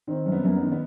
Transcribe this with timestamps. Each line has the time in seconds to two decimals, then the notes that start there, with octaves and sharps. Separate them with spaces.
0.07 D#3 C4
0.26 F#2
0.32 B3
0.43 F#2 A#3
0.56 B3
0.62 D#3
0.72 B3